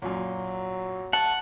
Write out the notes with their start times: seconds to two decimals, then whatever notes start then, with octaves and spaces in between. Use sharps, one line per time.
0.02 F#2 A#2 F#3
1.13 A3 F#5 A5